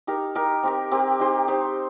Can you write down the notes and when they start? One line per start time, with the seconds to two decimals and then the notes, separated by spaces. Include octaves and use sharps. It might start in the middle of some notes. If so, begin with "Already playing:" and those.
0.07 D#4 G4 A#4
0.35 D#4 G4 A#4
0.63 C4 G4 A#4
0.91 C4 G4 A#4
1.19 D#4 G4 C5
1.48 D#4 G4 C5